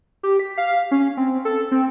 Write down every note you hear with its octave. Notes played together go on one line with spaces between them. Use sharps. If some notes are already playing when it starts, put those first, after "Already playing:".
G4
B6
F5
C#4
C4
A4
C4